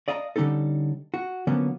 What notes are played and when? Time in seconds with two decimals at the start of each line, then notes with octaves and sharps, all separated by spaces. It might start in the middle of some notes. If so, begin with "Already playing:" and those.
0.08 D5 D#5 F5 A5 A#5
0.36 D3 G3 C#4 D#4 A4
1.14 F#4
1.47 D3 F3 F#3 A#3 B3 C#4